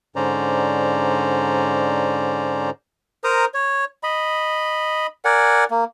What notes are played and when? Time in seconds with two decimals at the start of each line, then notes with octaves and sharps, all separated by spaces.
0.16 G#2 D3 C#4 C5 D5 A#5
3.24 A#4 C5 A#5 D#6
3.54 C#5
4.03 D#5 B5
5.25 A#4 D5 F#5 G#5
5.71 A#3